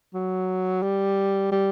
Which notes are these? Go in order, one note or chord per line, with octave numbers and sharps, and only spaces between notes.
F#3
G3
G3